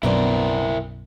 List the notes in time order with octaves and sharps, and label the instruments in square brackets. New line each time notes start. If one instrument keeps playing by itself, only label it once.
[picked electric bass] B1 F#2 B2 [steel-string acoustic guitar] B3 C4 D4 [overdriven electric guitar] E4 A#4